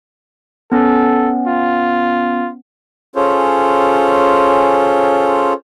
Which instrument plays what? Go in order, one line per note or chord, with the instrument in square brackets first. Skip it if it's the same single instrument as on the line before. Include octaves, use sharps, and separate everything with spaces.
[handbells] B3 C#4 [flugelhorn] A4
[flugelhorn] F4
[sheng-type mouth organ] C#4 F4 G#4 A4 C5 C#5